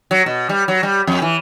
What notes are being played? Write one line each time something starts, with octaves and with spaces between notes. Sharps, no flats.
F#3
B2
G3
F#3
G3
F2
E3